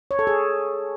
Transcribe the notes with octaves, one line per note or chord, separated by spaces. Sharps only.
C#5
A4
G#4